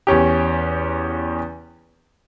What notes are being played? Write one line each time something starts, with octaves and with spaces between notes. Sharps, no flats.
E2 C#4 G4